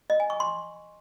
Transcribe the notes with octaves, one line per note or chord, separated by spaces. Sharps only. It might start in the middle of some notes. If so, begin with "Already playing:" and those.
D#5
G#5
C#6
C6